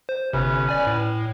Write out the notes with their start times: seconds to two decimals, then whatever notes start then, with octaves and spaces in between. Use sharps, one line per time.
0.09 C5
0.33 G1 C3 C#4 B4
0.69 D5 G#5
0.87 A2